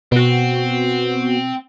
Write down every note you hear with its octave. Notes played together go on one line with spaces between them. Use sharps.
B2 B3 C4 F#4